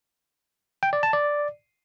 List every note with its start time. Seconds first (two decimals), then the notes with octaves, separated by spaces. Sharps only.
0.83 G5
0.93 D5
1.03 A5
1.13 D5